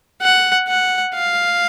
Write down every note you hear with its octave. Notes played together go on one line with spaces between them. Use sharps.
F#5
F#5
F5